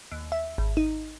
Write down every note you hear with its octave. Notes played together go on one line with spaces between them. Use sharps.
D#2
E5
G#1
D#4